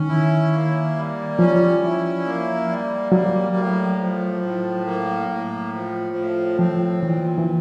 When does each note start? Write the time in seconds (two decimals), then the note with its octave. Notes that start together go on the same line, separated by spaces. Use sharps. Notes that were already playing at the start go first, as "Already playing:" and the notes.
Already playing: D#3 C#4
0.09 E4
0.53 A#3
0.95 G3
1.39 F3 C#4
1.82 E4
2.25 A#3
2.69 G3
3.12 F#3 A#3
3.56 A2
3.98 F3
4.43 A2
4.86 A#3
5.29 A2
5.73 F3
6.15 A2
6.59 F3 C4
7.02 A#2 E3
7.38 E3